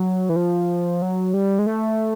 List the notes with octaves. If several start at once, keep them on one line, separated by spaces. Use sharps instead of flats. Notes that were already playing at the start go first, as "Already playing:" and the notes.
Already playing: F#3
E3
F3
F#3
G3
G#3
A3